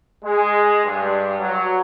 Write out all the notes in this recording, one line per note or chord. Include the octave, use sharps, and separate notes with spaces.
G#3
G2
F#3